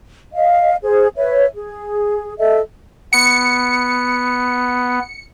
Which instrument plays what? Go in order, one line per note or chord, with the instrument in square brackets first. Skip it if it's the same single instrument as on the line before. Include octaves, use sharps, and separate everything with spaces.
[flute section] D#5 F5
G#4 C5
B4 C#5 E5
G#4
A4 D#5 E5
[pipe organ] B3 [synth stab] C#7